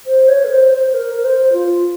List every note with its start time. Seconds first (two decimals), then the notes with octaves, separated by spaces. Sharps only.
0.06 C5
0.28 C#5
0.44 A#4
0.50 C5
0.73 C5
0.94 A#4
1.14 A#4
1.24 C5
1.53 F4